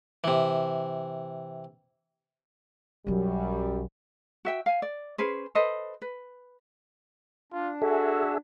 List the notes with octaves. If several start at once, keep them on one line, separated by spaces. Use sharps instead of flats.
C3 E3
B1 F#2 F#3 G3
F#4 E5 G5
F5 G#5
D5
C#4 G#4 B4 C5
A4 B4 C5 D#5
B4
D4 F4
F#4 G#4 A4 E5